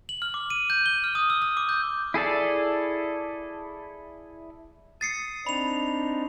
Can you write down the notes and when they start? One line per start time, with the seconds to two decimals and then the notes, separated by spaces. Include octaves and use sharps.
0.09 F#7
0.22 F6
0.34 D6
0.50 D#7
0.70 G6
0.86 G7
1.04 F6
1.15 D#6
1.30 E6
1.42 E6
1.57 D6
1.69 G6
2.14 E4 G#4 A4 D5
5.01 D#6 A6 C7 C#7
5.47 C4 D4 D#4 B5 F7